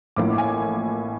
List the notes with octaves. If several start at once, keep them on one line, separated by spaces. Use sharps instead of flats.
A1 A2 F3 A#3 D6
G#5